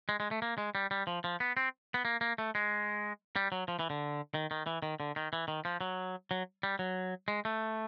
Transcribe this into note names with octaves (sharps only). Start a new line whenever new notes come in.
G#3
G#3
A3
A#3
G#3
G3
G3
F3
F3
B3
C4
B3
A#3
A#3
A3
G#3
G3
F#3
F3
E3
D3
D#3
D#3
E3
D#3
D3
D#3
E3
D#3
F3
F#3
F#3
G3
F#3
G#3
A3